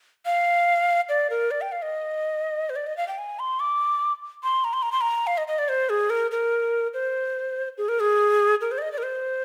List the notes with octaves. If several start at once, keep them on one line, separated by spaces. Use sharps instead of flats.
F5
D5
A#4
D5
G5
F5
D#5
C5
D5
D#5
F5
G5
G#5
C6
D6
C6
A#5
C6
A#5
C6
A#5
F5
D#5
D#5
D5
C5
G#4
A#4
A#4
C5
G#4
A#4
G#4
A#4
C5
D5
D#5
D5
A#4
C5